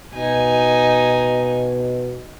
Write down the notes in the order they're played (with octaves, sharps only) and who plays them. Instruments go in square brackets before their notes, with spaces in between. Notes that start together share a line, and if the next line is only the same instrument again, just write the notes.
[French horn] B2 [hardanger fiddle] D#4 G#5